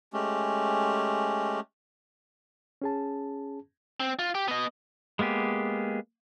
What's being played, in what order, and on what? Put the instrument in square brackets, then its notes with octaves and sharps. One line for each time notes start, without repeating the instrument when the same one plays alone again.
[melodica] G#3 A3 C#4 G4
[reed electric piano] C#4 G#4 A5
[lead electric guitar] C4
F4
G4
B3 D#5
[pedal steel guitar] G#3 A#3 B3 G4 G#4